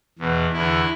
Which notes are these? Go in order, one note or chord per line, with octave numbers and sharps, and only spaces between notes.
E2 B2
E2 D3 E4